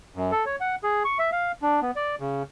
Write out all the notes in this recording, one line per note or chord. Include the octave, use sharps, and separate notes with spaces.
F#2
A4
C#5
F#5
G#4
C#6
E5
F5
D4
B3
D5
C#3